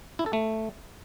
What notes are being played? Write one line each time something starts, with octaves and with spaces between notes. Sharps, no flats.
E4
A4
A3